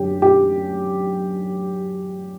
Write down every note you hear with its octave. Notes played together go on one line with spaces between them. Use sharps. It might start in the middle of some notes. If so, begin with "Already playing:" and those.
Already playing: F#2 D3 G4
G4